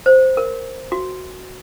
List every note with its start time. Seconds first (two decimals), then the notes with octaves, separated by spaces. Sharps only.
0.06 C5
0.37 A#4
0.92 F#4